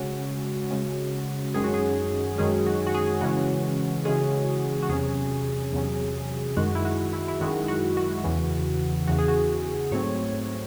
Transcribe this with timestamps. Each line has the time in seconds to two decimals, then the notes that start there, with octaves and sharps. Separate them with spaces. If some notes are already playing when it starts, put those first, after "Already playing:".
Already playing: C#3 G#3 C#4 F#4
0.71 C#3 G#3 C#4
1.54 F#2 D#3 G#3 C#4 G#4
1.64 F#4
1.74 G#4
2.38 F#2 D#3 G#3 C#4 G#4
2.66 F#4
2.87 F#4
2.94 G#4
3.21 C#3 E3 G#3 C#4 F#4
4.05 C#3 E3 G#3 C#4 G#4
4.83 F#4
4.89 E2 C3 F#3 C#4 G#4
5.73 E2 C3 F#3 C#4
6.57 F#2 D#3 G#3 F#4
6.75 E4
6.85 F#4
7.13 E4
7.28 E4
7.40 F#2 D#3 G#3 F#4
7.68 F#4
7.97 F#4
8.24 E2 C#3 E3
9.08 E2 C#3 E3 F#4
9.18 G#4
9.28 F#4
9.91 G#2 F#3 A3 C4 C#5